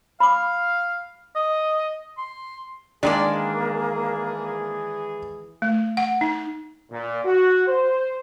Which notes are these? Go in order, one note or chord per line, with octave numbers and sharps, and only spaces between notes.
F5 B5 D6
D#5
C6
D#3 E3 G#3 A#3 D4 G#4 D5
A3
F#5
D#4
A#2
F#4
C5